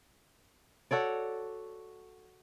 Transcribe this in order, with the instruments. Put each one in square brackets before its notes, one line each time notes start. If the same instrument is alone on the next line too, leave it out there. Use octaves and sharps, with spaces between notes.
[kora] F#4 A4 C#5 D5